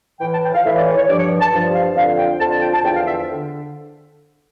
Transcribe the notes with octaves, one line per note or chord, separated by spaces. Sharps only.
A2 E3 G5
A5
G5
F5
A2 E3 E5
D5
C#5
C#5
G2 F3 D5
C#5
A5
G2 F3
F5
F2 D3 F3 F5
G5
F2 D3 F3 A5
A5
G5
A5
E2 D3 F3 G5
F5
E5
D3